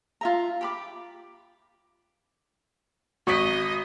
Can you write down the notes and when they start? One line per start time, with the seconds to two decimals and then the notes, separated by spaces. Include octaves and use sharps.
0.21 F4 E5 A#5
0.61 G4 B5 D6
3.27 G#1 F#4 D#5 F#5 C#6 D#6 B6